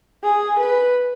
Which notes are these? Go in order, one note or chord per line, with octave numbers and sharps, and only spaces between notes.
G#4
B4